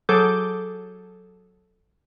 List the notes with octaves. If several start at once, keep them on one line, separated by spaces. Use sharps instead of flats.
F#3 G#4 A4 D6 G6